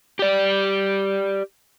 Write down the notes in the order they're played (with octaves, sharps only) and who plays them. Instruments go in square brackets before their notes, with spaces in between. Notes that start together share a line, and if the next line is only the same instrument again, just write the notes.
[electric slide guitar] G4 D5